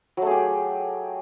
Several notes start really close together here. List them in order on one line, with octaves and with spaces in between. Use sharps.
F#3 A3 G#4 G4